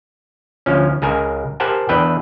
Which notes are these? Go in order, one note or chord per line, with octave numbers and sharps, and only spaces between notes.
D2 F3 C#4
C#2 G#4 A#4 G#5
G4 A#4 C5 F#5 G#5 A5
E2 D4 B4 E5 G5